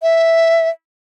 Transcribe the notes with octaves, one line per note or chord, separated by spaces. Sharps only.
E5